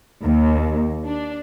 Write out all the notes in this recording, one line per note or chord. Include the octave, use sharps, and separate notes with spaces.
D#2
D4